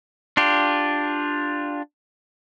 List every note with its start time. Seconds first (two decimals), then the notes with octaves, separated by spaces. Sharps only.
0.37 D4 F4 G4